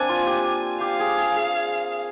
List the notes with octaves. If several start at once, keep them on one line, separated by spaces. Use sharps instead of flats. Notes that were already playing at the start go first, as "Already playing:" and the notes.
Already playing: A#3 C4 D4 G#5
F4
G4
G4 F5
G#4
G#4
G#4